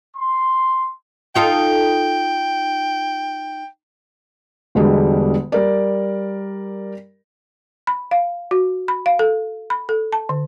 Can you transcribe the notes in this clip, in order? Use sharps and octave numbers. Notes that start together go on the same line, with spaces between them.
C6
D#4 F4 A4 G5
E1 B2 D3 G3 G#3
G3 A#4 D5
B5
F5
F#4
B5
F5
A4
B5
A4
A5
D3